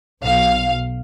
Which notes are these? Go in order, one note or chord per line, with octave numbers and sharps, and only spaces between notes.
B1 F5